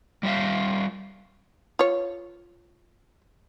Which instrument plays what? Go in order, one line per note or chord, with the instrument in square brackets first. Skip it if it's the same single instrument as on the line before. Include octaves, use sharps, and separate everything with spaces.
[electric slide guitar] G3 F4 C#5 E5 F5
[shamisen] F4 C#5